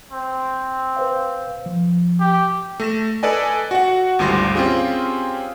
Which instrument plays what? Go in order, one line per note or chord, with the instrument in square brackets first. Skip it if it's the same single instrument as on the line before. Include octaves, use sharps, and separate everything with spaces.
[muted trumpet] C4
[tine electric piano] B4 C5 F5
F3
[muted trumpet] G4
[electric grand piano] A3 A#6 E7
A4 B4 D5 D#5 G#5
F#4 F#5
G#1 D2 G3 F4 C6 A#6
C4 C#4 F4 G4 G#4